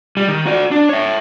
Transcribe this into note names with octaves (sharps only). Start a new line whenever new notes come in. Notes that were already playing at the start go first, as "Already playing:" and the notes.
G3
D#3
F#4 D5
D4
C#5 E5